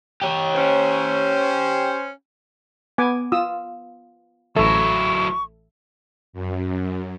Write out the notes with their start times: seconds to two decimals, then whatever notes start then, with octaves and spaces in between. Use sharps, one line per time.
0.22 G4 C#5
0.55 C#4 C5
2.98 B3 G#5 D6
3.32 F4 D#6 E6
4.56 A1 F#3 E4 A4 E5 C#6
6.33 F#2